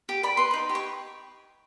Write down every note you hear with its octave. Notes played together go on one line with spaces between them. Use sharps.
G4
D5 B5
B4 C6
D#4 B5
G4
C#6